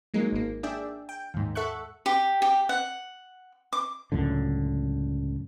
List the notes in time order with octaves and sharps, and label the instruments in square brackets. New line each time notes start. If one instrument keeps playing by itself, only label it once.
[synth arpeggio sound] F#3 G#3 A#3 D#4
G#1 A#3
D4 G#4 D5 E5 G5
G5
D#2 G#2
A4 E5 F#5 C#6 F#6
[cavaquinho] G4
G4
F#5
D6
[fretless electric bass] C#2 F#2 A2 D3